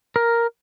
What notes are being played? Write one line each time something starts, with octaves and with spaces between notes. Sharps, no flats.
A#4